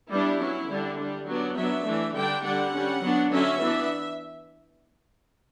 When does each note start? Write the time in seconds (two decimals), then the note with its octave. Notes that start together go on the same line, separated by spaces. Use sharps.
0.11 G3 B3 D4 E4
0.40 F#3 C#4
0.69 D3 G3 D4
0.98 G3 D4
1.27 F#3 B3 D4
1.56 F#3 B3 D4 E5
1.85 E3 A3 D4
2.14 D3 G3 D4 G5
2.44 D3 G3 D4 F#5
2.73 G3 C#4
3.02 F#3 B3 D4
3.31 D3 F#3 C#4 E5
3.60 E3 B3 D4